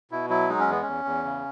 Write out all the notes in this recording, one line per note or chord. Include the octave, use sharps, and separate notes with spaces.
B2 E4
F#3 E4
G#3 D#4
C#4
E2 B3
E2 C#4
E2
C#3